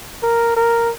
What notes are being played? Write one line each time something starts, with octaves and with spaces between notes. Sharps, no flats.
A#4
A#4